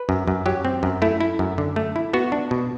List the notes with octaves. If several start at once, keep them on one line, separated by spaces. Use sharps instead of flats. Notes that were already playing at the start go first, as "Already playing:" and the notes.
Already playing: B4
F#2
F#2
F#3 G4
C4
F#2
A3 E4
E4
F#2
D3
A3
E4
B3 F#4
D4
B2